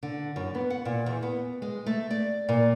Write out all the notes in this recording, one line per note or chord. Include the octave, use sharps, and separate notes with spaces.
D3
F#2
B3
F#5
A#2
E2
B3
G#3
A3
D5
A#2